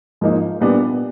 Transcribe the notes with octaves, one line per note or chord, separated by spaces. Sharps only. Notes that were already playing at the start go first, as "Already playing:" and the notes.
G#2 F3 A#3 D#4
A#2 G3 B3 D4